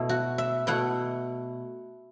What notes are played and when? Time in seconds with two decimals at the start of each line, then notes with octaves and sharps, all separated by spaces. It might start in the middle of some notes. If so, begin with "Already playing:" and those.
Already playing: B2 A3 E4
0.09 F#4
0.38 E5
0.67 B2 A3 E4 F#5